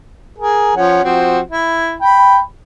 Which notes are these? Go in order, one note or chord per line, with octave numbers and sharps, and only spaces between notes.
G#4 A#4
F3 C#4 F#5
F3 C4 F#4
E4
G5 B5